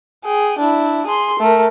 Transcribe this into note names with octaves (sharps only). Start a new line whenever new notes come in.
G#4 G5
D4 E4
G#4 C6
A3 A#4